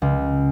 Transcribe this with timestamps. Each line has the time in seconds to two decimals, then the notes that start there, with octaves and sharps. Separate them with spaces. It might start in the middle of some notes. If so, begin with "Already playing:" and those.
0.02 C#2